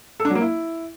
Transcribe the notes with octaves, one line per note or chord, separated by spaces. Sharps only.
A4
D4
F#3
A#3
E4